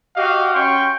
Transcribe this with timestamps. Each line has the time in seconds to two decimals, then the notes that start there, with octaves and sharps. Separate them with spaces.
0.16 F#4 G4 D#5 F5
0.54 C#4 G5 C6 C#6